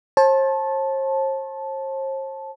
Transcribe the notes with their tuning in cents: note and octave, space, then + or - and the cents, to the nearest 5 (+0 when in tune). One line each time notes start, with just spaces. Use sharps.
C5 +45 A5 -10